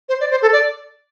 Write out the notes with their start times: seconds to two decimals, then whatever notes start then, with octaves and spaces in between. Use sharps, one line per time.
0.09 C5
0.20 D5
0.31 C5
0.42 A4
0.53 D5